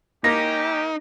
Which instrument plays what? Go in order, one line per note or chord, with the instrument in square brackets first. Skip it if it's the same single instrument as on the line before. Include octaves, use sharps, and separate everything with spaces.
[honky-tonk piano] A#3 [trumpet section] C#4 G4 [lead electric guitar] D#4 [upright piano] A#6